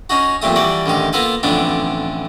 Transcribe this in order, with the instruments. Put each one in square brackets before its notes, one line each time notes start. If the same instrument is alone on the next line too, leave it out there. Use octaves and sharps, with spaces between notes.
[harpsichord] C#4 D#4 F#4
F2 A#2 G3 A3 D#6
E3 G3 F#4 D5
A1 D3 D#3 G4
A#3 B3 F4 A4 B4
A1 F2 D3 B3 D4